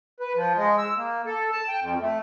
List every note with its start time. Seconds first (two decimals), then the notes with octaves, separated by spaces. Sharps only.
0.20 B4
0.35 F3
0.57 G#3
0.78 E6
0.96 A#3
1.26 A4
1.52 A5
1.68 G5
1.81 F2
2.01 A3